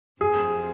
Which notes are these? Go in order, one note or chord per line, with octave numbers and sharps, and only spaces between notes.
F2 C3 F3 C4 G#4